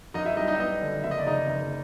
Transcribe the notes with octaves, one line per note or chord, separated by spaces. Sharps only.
F#2 D#4 D#5
E4 E5
G3 D#4 D#5
D#4 D#5
E5
B3 D#4 D#5
D3
F#1 E5
D#5
D5
C#3 D#4 D#5
F#1